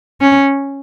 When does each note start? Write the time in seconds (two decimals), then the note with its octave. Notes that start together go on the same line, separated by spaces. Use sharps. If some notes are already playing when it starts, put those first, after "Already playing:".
0.21 C#4